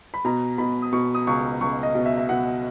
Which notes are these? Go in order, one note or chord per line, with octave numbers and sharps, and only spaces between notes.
B5
B2 A#5
B2 B5
D#6
B2 C#6
D#6
C#2 C#6
C#2 C#6
D#5
B2
E5
E5
B2 F#5